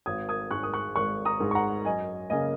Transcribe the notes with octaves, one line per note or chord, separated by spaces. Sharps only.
G#1 D#6 G#6
D#6 G#6
G#2 G#3 C#6 F#6
D#6
C#6 F#6
G#1 C#6 F#6
A#5 D#6
G#2 G#3
C#6
F#5 A#5
F#2 D#5 G#5
C#3 A#3 D#5 G#5